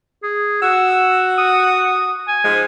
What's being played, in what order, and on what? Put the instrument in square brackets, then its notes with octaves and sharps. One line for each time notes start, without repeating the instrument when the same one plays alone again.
[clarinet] G#4
[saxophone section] F#4 [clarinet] E6
[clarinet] D#6
G#5
[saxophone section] G#2 F3 G#3